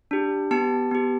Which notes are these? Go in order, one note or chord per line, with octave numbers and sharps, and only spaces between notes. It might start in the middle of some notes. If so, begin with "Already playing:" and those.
D4 G4
B3 G4 A5
B3 G4